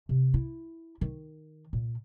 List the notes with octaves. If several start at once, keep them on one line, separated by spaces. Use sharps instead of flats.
C3
E4
D#3
A#2